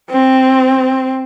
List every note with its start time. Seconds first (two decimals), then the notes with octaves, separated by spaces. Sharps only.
0.11 C4